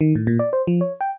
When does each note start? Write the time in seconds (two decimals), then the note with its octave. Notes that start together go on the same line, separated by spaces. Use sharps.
0.01 D#3
0.15 A2
0.27 A#2
0.39 D5
0.53 C5
0.67 F3
0.81 C#5
1.01 G5